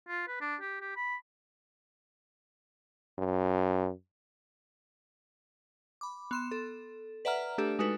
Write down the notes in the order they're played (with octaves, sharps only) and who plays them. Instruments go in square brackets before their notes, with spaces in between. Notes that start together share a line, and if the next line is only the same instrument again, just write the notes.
[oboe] F4
B4
D4
G4
G4
B5
[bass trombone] F#2
[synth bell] B5 D6
B3 C6 E7
A4
B4 D5 E5 F#5 A#5 F6
A3 D4 G4 A4
G#3 D#4 F#4 A4 B4